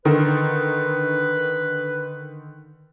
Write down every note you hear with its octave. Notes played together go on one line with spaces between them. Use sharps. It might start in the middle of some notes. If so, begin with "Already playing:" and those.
D3 D#3 B4